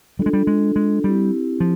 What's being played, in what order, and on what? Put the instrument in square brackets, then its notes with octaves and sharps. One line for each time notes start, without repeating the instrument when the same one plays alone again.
[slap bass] G3 [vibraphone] D4 F4 A4
[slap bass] G#3
G3
G#3
G#3
[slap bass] G3 [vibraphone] C4 E4 G4
[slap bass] F3